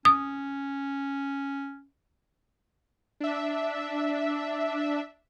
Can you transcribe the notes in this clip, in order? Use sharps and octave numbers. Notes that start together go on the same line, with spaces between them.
C#4 D#6
D4 E5